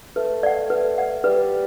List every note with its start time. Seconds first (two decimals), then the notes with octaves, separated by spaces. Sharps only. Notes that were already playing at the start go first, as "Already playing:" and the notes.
0.16 A3 B4
0.43 D5 F#5
0.70 B4
0.98 D5 F#5
1.24 G3 B4